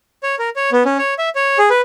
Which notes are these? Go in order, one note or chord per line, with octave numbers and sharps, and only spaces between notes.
C#5
A#4
C#5
B3
C#4
C#5
E5
C#5
G#4
B4